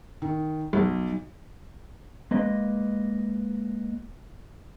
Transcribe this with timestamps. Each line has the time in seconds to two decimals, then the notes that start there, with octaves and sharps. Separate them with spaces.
0.22 D#3
0.73 B1
2.31 G#3 A#3 B4 D#5